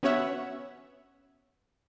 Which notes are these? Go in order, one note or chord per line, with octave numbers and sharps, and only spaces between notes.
B3 C#4 F#4 C#5 E5 F#5